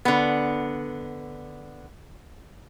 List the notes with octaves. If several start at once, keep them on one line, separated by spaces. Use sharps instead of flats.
D3 B3